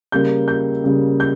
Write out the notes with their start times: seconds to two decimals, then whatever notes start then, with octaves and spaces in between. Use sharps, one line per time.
0.12 C#3 G3 A#3 G6
0.48 G6
0.84 C#3 G3 A#3
1.20 G6